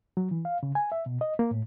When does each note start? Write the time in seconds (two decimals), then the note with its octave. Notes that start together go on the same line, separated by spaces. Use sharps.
0.17 F#3
0.31 E3
0.45 F5
0.63 C#3
0.75 G#5
0.92 E5
1.06 B2
1.21 D#5
1.39 A#3
1.51 A2